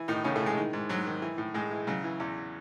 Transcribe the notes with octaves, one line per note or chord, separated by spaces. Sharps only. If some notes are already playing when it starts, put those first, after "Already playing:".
Already playing: E3
A2 D#3 D#4
A2 C#3 C#4
A2 A3
E3
G#3
D#3
G#2
G#2 F#3
D#3
E3
A2
A2 G#3
E3
C#3 F#3
E3
E2